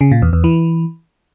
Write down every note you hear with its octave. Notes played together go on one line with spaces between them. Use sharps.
C#3
A#2
E2
E2
E3